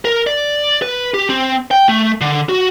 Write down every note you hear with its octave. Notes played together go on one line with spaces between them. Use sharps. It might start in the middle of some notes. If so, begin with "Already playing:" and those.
A#4
D5
B4
G4
C4
G5
A3
D3
F#4